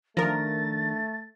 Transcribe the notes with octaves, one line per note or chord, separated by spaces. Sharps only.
D#3 F3 A3 D4 A#4 A6 A#6